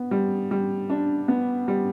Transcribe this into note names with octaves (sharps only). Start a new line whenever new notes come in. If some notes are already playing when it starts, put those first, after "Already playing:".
Already playing: B3
G3
G3
D4
B3
G3